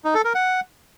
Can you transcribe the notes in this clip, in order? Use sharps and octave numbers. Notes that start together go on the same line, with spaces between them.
D#4
A4
A#4
F#5